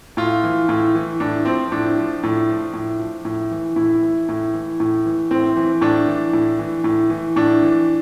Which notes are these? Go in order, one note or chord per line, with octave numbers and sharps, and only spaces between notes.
A2 F4
E3
A2
E3
A2 D4
F3 C4
A2 D4
F3
A2
F3
A2
F3
A2
E3
A2 E4
E3
A2
E3
A2
E3
A2 C4
E3
A2 D4
E3
A2
E3
A2
E3
A2 D4
E3